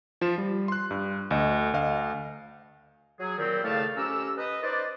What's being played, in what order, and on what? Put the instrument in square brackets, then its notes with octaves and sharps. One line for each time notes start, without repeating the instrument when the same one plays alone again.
[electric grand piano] F3 F4 E7
G3
C6 F#6
G2
D2 D#5
D2 D#5 F5
[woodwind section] F#3 G#4
A#2 D#3 F#3 G3 C4
A2 C#3 A3 D5 F5 A5
F2 C#4 G4 A#5 E6
B4 D#5
D#4 B4 C5 D5